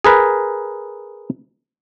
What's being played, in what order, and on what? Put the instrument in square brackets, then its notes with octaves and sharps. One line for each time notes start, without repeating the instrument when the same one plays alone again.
[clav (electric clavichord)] G#4 A#4 B4